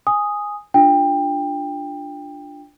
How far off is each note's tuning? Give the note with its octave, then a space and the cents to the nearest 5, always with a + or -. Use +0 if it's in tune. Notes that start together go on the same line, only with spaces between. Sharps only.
G#5 -10 D#6 +0
D4 +0 F4 +0 G5 +20